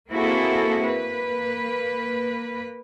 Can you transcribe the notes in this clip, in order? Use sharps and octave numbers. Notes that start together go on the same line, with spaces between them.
A#3 C4 E4 F#4 G#4 A4
A#3 B4